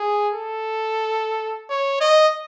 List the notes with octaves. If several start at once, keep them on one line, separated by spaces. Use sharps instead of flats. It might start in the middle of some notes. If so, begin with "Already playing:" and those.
Already playing: G#4
A4
C#5
D#5